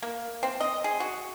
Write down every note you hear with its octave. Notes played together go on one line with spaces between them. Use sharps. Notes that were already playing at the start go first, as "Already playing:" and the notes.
A#3
C4
D#5
G#4
F#4